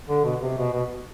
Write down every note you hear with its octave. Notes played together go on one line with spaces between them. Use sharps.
D3
B2
C3
B2
B2